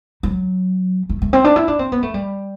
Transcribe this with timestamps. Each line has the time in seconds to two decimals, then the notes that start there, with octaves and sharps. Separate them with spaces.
0.23 F#3
1.09 A3
1.22 A3
1.33 C4
1.44 D4
1.56 E4
1.68 D4
1.79 C4
1.92 B3
2.03 A3
2.14 G3